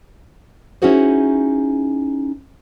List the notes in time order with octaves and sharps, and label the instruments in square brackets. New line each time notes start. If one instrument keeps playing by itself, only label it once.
[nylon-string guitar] C#4 D#4 E4 F#4 G#4 C5